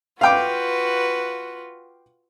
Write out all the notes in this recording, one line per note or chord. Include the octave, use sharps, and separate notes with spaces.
F4 F#4 B4 F5 G5 D6